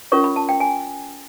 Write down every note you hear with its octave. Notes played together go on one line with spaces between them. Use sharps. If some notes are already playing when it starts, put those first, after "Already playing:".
C#4 F4 A#4 C#5 C#6
B5
A5
G5
G#5